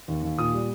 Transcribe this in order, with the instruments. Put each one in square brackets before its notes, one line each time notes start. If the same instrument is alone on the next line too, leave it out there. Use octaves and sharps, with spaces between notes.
[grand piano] D#2
D#2
A#2 D#6
G3